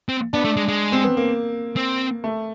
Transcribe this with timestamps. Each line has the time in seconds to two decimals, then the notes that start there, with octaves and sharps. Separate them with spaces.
0.09 C4
0.33 B3 D4
0.45 A3
0.57 G#3
0.68 G#3
0.92 C4
1.04 B3
1.17 A#3
1.76 C4
2.24 A3